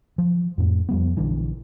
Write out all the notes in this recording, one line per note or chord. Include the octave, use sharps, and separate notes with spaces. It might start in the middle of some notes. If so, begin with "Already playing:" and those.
F3
F2 A2
F2 G3 B3
A#1 D3 E3